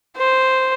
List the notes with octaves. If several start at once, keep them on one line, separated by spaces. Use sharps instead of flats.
C5